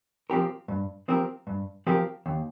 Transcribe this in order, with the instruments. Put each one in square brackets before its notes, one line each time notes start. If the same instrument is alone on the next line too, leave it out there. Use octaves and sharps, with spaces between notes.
[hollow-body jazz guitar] F3 C4 G4 A#4
G2
F3 C4 G4 A#4
G2
F3 C4 G4 A#4
D#2